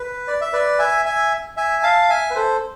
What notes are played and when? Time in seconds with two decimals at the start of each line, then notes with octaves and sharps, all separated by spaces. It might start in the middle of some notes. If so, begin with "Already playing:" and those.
Already playing: B4
0.28 D5
0.41 E5
0.53 B4 D5
0.79 E5 G#5
1.06 E5 G#5
1.57 E5 G#5
1.83 F5 A5
2.09 E5 G#5
2.31 B4
2.35 A4 C5